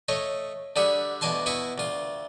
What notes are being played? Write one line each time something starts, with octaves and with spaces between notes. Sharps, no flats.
A3 C#5 D#5
D3 G3 G#4 E5 F#5
D2 B2 D5 G#5 A5 C6
B2 E4 C#6 D#6
D2 F4